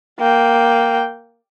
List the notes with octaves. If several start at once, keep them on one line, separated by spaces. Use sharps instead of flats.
A#3 G5